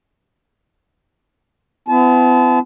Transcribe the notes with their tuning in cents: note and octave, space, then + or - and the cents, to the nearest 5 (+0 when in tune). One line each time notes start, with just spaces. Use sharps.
B3 +45 E4 +40 A5 -30